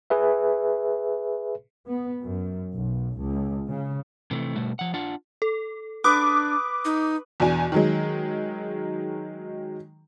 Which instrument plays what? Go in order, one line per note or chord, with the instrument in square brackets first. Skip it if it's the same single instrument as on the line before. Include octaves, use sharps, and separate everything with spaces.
[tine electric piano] G#4 B4 E5
[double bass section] B3
F#2
B1
C#2
C#3
[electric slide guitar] C3 E3 A3
B2 G3 A3 F#4
F3 F#5
D4 F4 F#5 A5
[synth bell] A4
[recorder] D4 [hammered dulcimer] B4 [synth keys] D6 [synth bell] D#6
[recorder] D#4
[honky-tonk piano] E2 B2 D4 G#5
D#3 F#3 G#3